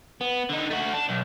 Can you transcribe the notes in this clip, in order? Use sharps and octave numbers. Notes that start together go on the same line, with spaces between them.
B3
D3 D#4
A3 F#4
D4
B1